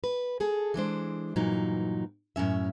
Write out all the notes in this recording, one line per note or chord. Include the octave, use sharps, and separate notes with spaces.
B4
G#4 A4
E3 G#3 D4 C5
G2 A#2 E3 F#3 D#4
F#2 A2 C#4 E5